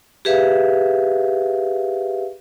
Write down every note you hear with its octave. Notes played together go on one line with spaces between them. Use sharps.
G4 G#4 B4 E5 F5